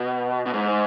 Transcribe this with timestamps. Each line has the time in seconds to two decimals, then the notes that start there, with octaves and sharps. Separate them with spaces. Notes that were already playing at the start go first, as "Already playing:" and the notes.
Already playing: B2
0.46 B2
0.54 G#2